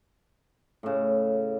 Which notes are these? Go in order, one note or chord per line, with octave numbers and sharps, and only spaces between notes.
A2 C#3